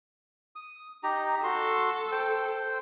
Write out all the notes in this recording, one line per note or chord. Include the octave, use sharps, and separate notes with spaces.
D#6
D#4 G4 A#5
F#4 A4 C6
C5 G5